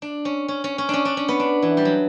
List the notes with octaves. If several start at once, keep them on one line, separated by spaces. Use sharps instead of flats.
D4
C#4
C#4
C#4
C#4
C#4 D4
D4
C#4
B3
D4
E3
G3
F#3